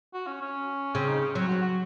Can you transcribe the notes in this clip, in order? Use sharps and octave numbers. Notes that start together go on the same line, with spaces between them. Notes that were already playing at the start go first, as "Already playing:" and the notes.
F#4
C#4
C#4
C#3 C4
D#4
C#4
F#3 C4
F#4
F#4